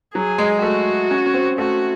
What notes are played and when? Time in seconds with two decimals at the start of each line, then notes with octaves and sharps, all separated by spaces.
0.15 F#3 G#4
0.38 G#3
0.62 A3 F#4
1.11 C#4
1.26 C#4
1.34 C4
1.58 A3 F#4